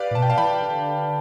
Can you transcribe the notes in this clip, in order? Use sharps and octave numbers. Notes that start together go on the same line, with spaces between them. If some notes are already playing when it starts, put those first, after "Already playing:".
Already playing: G4 B4 D5 F5
A2
B2 A5
G5
F5 A5
E3 G5 B5
D3